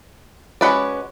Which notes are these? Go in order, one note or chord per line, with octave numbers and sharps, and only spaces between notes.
G#3 C#4 F#4 B4 D5